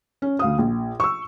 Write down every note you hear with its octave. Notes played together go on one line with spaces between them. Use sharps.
C#4
D2 F5 D#6
A#1
C#6 E6